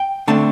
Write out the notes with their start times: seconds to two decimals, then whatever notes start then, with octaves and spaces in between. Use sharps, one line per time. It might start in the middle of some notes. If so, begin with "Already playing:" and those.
Already playing: G5
0.28 D3 A3 C4 A5